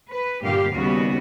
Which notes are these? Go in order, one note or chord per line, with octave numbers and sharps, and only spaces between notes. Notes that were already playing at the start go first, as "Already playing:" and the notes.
B4
G2 A#2 D3 A#3 G4 F5
D#2 C#3 G3 B3 F#4